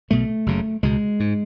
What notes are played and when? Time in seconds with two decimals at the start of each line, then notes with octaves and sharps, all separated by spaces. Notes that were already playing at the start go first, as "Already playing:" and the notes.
0.10 B1 B2 A3
0.46 F#1 F#2 C#3
0.83 C#2 B2 G#3
1.20 G#2